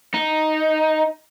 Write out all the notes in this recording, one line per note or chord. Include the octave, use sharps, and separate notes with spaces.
D#4